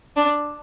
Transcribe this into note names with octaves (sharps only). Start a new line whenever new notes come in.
D4